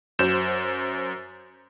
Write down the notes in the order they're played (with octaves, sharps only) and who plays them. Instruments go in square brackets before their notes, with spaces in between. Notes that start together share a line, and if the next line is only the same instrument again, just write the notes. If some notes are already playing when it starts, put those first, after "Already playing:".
[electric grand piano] F#2 G6 E7 [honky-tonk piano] F#3 F#4 C5